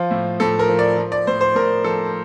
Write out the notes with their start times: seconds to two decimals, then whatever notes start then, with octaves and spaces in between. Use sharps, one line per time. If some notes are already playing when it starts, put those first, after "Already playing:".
Already playing: F3 F4
0.11 A2
0.40 A2 A4
0.59 A#4
0.68 F3
0.79 D5
0.97 F3
1.12 D5
1.27 A2 C5
1.41 C5
1.55 A2 A#4
1.84 F3 A4